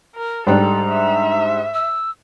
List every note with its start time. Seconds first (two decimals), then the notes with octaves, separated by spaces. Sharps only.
0.15 A#4
0.47 G#2 G3 D4 A4 A#5
0.89 E5
1.74 E6